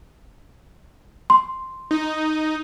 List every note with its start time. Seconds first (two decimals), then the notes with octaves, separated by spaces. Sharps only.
1.30 C6
1.91 D#4